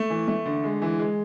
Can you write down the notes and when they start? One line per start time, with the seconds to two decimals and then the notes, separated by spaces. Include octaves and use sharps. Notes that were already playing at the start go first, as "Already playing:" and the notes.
Already playing: A3
0.10 E3
0.28 A3
0.46 D3
0.64 G#3
0.82 E3
0.99 G#3